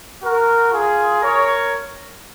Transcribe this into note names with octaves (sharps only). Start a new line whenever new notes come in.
F#4 A#4
F4 G#4
A#4 C#5